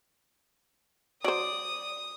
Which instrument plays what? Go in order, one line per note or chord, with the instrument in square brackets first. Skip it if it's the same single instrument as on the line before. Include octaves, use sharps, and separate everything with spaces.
[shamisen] F#3 C5 [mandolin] D5 [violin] D#6